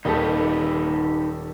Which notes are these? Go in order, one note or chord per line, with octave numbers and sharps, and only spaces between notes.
D#1 D#3 D#4 G4 A4 B4